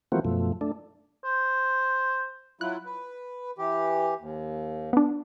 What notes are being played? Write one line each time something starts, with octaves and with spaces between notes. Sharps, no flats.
E3 F3 A3 A#3 C4 F#4
F#2 B2 F3 A3
A3 D4
C5
F#3 E4 F4 F#6
B4
E3 G4
D#2
B3 D4